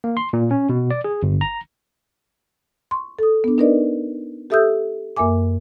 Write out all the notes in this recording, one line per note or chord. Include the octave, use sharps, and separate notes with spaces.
A#3
C6
A#2
C#4
B2
D5
G#4
G1
A#5
C6 C#6
A4 D#6
B3 D4
D4 D#4 A#4 B4 D5 D#5
G4 A4 E5 D#6 E6 G6
F#2 A#3 A#4 E5 G#5 D6